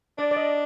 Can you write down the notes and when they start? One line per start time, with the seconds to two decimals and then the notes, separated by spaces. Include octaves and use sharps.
0.18 D4 D5
0.31 D5
0.36 D#5